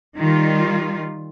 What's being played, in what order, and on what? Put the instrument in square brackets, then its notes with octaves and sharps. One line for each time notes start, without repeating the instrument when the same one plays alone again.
[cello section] D#3 G3 F4